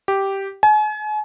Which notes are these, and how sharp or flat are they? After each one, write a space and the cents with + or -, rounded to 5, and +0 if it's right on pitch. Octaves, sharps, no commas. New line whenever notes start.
G4 -5
G#5 +40